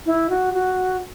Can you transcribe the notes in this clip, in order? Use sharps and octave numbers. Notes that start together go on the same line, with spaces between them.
E4
F#4
F#4